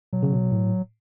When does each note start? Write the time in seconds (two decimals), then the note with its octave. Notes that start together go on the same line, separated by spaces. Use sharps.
0.13 B2 F#3
0.23 C#3
0.32 B2
0.51 A2